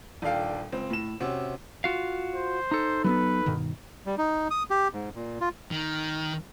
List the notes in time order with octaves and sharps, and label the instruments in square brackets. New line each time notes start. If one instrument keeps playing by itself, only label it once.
[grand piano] D#1 D4 A4 F5 G5
C#2 C4
A2 E7
C3 C4 C#4 F#4
[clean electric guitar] F4 F#4 F5
[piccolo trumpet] C5
[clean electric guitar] D#4 A4
[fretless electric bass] F#3 A3 B3 [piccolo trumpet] B4
[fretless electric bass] G2 B2 D#3
[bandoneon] G3
D#4
D#6
G4
G#2
A#2
F4
[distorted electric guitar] D#3